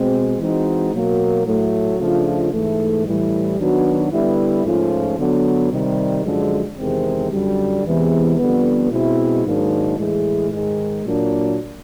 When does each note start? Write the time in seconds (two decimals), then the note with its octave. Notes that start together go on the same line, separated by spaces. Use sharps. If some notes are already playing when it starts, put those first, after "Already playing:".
Already playing: B2 G#3 C4
0.39 E3 G#3 C4 D#4 F#4
0.93 B2 F#3 A#3
1.46 A2 F#3 A3
1.99 C#3 F3 A3 D4 F4
2.53 G#2 E3 A3
3.06 A2 E3 G3
3.59 D#3 F#3 B3 D4 F#4
4.12 D3 G3 B3 E4
4.65 G#2 F3 A3 C#4 F4
5.19 D3 F#3 B3
5.72 C3 D#3 G3
6.25 F#2 D3 F3 G#3
6.78 E2 C3 D#3 G#3 C4
7.31 F#2 D3 G3
7.84 E2 C3 E3 G#3 B3
8.38 F2 D3 G3 B3
8.91 B2 G#3 C4 E4
9.45 G#2 D#3 F#3 A#3 D4
9.98 A2 E3 G#3
10.51 G#2 D#3 G#3
11.05 A#2 F#3 A#3 D4